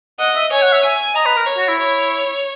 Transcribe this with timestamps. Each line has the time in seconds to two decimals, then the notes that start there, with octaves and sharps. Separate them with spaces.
0.19 D#5 F#5
0.36 E5
0.52 C#5 G#5
0.62 F#5
0.73 E5
0.83 E5 G#5
1.16 D#5 A#5
1.26 B4
1.37 A#4
1.47 C#5
1.58 F#4
1.68 E4
1.79 C#5